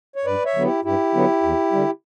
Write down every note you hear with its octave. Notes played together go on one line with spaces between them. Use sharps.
C#5
G2 B4 D5
C#5 E5
D3 F#3 B3
E4 G4
G2 E4 G4
D3 F#3 B3
E2
D3 G3